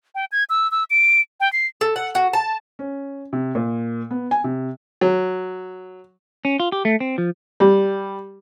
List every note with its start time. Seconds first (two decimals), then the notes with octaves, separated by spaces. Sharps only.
0.15 G5
0.32 G#6
0.50 E6
0.71 E6
0.90 D7
1.40 G5
1.53 C7
1.81 A4
1.96 F#5
2.15 F#4
2.33 A5
2.79 C#4
3.33 C3
3.55 A#2
4.11 B3
4.31 G#5
4.44 C3
5.01 F#3
6.45 C#4
6.60 F4
6.72 G4
6.85 A3
7.00 C4
7.18 F3
7.60 G3